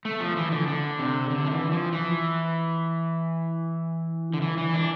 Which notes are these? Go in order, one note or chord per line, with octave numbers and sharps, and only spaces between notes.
A3
F3
E3
D3
D3
C3
D3
F3
E3
F3
E3
D3
E3
E3
D4